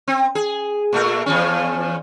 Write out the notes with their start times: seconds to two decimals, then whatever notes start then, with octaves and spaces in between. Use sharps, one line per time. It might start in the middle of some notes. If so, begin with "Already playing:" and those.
0.08 C4
0.35 G#4
0.93 A#2 A3 A#4
1.26 E2 F3 C#4